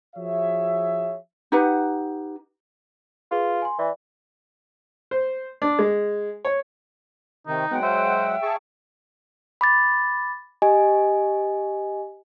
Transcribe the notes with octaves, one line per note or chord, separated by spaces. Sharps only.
F3 F#4 G#4 C#5 E5
D#4 G4 B4 F#5
F4 G#4 B4
G#5 C6
E3 D5
C5
D4
G#3
C#5
C3 D#3 D#4
F#3 G#3 B3 F#5 G5
C5 E5
G#4 A5 C#6
B5 D6 A6
G4 D#5 G#5